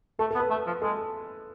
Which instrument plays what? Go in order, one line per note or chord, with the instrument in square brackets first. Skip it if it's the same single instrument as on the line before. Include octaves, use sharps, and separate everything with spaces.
[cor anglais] A3 [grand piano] A4
[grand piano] A4
[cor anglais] B3
[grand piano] B4
[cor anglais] A3
F3
[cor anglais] G#3 [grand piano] A4